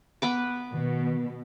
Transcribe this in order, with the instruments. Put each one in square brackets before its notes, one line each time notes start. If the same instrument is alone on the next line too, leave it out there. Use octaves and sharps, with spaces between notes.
[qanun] B3 B4 D6
[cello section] B2 [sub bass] D#3